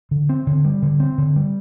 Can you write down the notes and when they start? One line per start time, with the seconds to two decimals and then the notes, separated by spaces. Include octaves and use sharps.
0.11 D3
0.29 C4
0.47 D3
0.65 G3
0.82 D3
1.00 C4
1.18 D3
1.36 G3